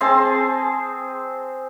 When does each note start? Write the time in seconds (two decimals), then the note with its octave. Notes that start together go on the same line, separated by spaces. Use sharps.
0.01 C4 G#4 A5 C6